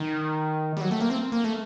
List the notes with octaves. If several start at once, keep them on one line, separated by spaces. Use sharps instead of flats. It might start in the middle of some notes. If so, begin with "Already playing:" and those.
Already playing: D#3
G3
F#3
A3
A#3
C4
A#3
A3